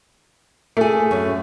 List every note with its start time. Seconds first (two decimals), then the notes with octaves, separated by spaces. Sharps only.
0.77 A3 G#4 A#4
1.11 F#2